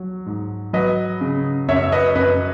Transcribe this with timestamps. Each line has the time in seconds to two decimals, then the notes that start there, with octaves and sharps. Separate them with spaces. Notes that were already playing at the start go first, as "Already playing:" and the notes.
Already playing: F#3
0.26 G#2
0.73 F#3 B4 D#5
1.21 C#3
1.68 F#2 C#5 E5
1.83 E5
1.92 B4 D#5
2.15 F#2 B4 D#5